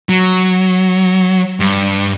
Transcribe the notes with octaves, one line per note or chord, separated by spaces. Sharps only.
F#3
G2